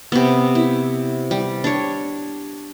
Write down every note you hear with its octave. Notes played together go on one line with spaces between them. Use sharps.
C3 B3
E4
G3
D4 C#5